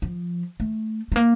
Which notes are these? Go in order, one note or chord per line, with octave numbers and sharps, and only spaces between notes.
F3
A3
A3
A#3